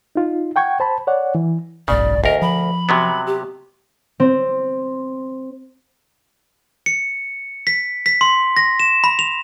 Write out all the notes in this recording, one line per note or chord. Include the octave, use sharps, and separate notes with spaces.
D#4 F4
F#5 G5 C#6 G#6
C5 A5 B5
C#5 D5 F#5
E3
F#1 B1 G#2 C#3 D5
D2 A#4 D#5
F3 B5
C3 F#3 B3
G4
C4
C#7
B6
B6
C6
A#6
E7
B5
F7